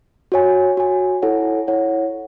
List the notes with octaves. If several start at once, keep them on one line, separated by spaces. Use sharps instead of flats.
F#4 C#5 G#5
F#4 C#5 G#5
E4 A4 C#5 F#5
E4 A4 C#5 F#5